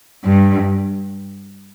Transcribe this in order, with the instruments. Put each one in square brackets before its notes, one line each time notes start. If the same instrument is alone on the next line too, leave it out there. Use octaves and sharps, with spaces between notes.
[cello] G2